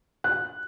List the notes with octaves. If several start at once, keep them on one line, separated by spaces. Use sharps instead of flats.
F#6